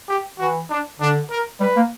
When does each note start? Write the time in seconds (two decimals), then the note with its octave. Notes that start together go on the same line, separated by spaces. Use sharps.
0.08 G4
0.38 E3 F#4
0.70 D4
1.00 D3 D4
1.30 A#4
1.60 G3 B4
1.76 A#3